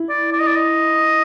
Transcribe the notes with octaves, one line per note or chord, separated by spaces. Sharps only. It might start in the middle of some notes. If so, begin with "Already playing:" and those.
Already playing: E4
D5
D5
D#5
D5
D#5